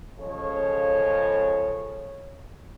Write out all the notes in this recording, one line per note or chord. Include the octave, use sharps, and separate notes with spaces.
C#3 F3 G#3 A4 C#5